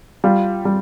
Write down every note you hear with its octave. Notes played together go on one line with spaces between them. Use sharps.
G3 F4
G3